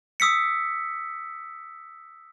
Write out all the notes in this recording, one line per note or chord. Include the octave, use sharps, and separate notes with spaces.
D#6 E6 B6 C#7